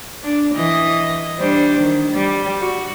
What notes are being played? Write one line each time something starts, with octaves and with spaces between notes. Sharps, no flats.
D4
E3 D#5
G3 D4 C5
D#3
G3
F#4